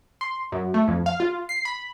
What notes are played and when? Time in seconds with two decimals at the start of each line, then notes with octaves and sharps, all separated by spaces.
0.21 C6
0.52 F#2
0.74 A3
0.88 F2
1.06 F5
1.20 F4
1.49 C7
1.65 B5